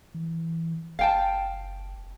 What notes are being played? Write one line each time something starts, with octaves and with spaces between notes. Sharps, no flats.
E3
F#1 F5 G5 A5